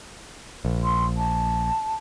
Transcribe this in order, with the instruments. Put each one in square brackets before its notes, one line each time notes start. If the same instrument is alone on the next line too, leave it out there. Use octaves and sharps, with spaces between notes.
[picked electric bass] A#1
[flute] C6
A5